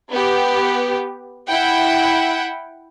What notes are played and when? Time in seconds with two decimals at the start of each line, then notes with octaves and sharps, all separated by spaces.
0.12 B3 G4
1.49 E4 F#5 G5